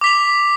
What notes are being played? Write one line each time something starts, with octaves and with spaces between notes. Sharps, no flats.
D6 B6 F7